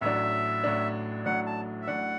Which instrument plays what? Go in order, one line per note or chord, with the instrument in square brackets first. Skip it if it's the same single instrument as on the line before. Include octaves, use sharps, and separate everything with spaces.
[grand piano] A1 A2 F#3 D4 [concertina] E5
[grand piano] A1 A2 F#3 D4
[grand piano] A1 A2 F#3 D4 [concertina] F#5
[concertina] A5
E5
[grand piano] A1 A2 F#3 D4 [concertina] F#5